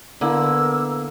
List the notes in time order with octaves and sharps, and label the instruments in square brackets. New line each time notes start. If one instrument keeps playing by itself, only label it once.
[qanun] D3 E4 [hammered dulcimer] A#3 [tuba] B3 [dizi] E6